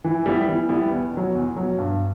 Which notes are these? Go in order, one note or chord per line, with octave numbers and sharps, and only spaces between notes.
E3
G3 B3 E4
E3
G3 B3 E4
E2
B2 F#3
E2
B2 F#3
G2